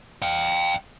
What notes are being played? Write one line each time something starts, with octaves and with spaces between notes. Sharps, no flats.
F5 G5